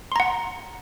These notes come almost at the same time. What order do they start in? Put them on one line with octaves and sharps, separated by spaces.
C6 A#5 F#5